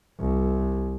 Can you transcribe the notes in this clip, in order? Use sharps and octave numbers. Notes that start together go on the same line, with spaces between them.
C2